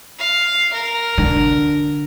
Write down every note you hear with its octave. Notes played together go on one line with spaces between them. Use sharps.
F5
A#4
D3